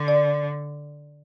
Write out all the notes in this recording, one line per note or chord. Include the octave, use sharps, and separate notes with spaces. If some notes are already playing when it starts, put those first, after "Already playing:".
Already playing: D3
D5